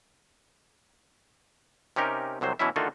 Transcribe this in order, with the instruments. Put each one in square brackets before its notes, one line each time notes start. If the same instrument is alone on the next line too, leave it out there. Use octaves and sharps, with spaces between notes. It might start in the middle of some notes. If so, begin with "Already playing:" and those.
[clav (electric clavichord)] C3 C#4 D#4 G4 A#4
C2 C3 F#3 C5
B2 E3 F#3 C#4 E4 E5
D3 D#3 A3 F4 F#4 A4